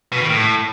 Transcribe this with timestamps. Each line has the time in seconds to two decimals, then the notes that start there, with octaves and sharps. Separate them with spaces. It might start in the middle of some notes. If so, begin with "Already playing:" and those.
0.12 B2
0.20 D#3
0.29 A2